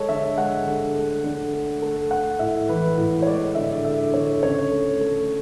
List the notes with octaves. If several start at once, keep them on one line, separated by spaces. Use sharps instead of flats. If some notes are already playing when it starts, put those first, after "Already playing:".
Already playing: G#3 A4 C#5
D3 E5
E5
G#3 F#5
D3
A3
D3
A3
A3
A3 F#5
A2 E5
E3 B4
A2
C#5
G#3 D5
D3 E5
D3 E5
D3 C#5
C#3 C#5
A3
A3